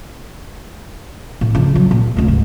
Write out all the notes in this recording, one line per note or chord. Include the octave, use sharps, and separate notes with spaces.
A2
C#3 F3
F#3
A#2
C#2 A3
G#2